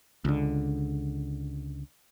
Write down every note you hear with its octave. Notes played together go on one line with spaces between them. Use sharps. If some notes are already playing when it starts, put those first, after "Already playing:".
C#2 D3